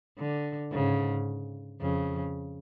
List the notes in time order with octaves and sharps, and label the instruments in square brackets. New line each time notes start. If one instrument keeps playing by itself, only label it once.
[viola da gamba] D3
[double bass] G#2 [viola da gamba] C#3
[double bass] F2 [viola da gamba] C#3